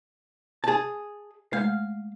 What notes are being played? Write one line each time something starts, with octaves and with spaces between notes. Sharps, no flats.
G#4 A5
G#3 A3 F5